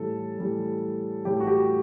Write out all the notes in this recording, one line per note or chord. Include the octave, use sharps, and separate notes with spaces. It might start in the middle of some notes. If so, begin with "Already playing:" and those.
Already playing: A2 E3 G3 A4
A2 E3 G3
A2 E3 G3 G4
F#4
G4